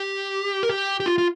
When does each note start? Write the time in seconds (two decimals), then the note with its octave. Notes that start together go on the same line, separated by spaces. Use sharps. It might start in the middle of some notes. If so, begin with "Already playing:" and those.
Already playing: G4
0.63 A#4
0.69 G4
1.00 G4
1.06 F4
1.18 F4